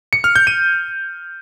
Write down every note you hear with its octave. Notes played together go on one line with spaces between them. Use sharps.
C#7
F6
G6
D#7